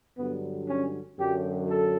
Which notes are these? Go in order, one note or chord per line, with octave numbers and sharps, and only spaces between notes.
G2 D3 F#3 B3
C#4
F#2 D3 F#3 G4
A4